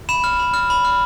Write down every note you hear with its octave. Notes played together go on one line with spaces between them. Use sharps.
B5 E7
F6
B5
F6
B5
F6